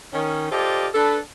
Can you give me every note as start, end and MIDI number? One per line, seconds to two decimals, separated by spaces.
0.13 0.48 51
0.13 0.48 61
0.51 0.88 65
0.51 0.88 67
0.51 0.88 69
0.51 0.88 72
0.51 0.88 74
0.51 0.88 75
0.95 1.18 62
0.95 1.18 69
0.95 1.18 71